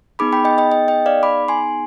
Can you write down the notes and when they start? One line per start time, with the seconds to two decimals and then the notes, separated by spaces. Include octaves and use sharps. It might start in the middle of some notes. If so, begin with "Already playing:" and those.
0.19 B3 D#4 G#4 B5 D6
0.33 G5 B5
0.45 D#5 G5
0.58 D#5 G5
0.72 D#5
0.88 D#5 G5
1.06 D5 F5
1.23 B5 D6
1.48 G#5 C6